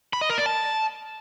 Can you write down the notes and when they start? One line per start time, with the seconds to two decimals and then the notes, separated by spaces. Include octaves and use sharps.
0.13 B5
0.21 D#5
0.30 A#4
0.38 D5
0.46 A5